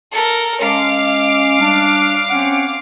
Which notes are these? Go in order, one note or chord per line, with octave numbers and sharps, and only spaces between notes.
A4 A#4
G#3 C#4 F5 D6
G3 D4
C4 C#4 F#5